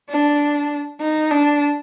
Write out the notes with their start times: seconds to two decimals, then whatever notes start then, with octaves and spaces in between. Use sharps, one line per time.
0.10 D4
1.01 D#4
1.31 D4